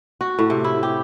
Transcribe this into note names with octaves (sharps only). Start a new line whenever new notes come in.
F#4
A2
C3
E4
G4